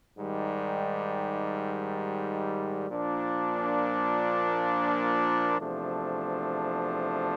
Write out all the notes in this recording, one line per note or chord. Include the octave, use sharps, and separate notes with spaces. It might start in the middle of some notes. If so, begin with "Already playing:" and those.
G#2 D#3 G3
A#2 F3 A#3 D4
E2 C3 F3 A3 D4